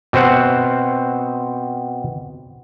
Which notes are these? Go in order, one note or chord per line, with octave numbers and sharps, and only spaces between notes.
B2 C4 C5 F#5